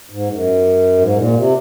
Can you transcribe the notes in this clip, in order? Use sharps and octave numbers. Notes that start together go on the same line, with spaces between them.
G#2
F#2
G#2
A#2
C3